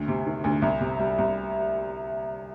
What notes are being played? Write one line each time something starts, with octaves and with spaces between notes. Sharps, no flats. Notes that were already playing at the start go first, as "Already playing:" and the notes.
Already playing: D2
C3
D#3
D2
C2
C3
G3
C2